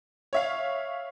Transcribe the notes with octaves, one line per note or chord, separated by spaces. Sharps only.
C#5 E5 F5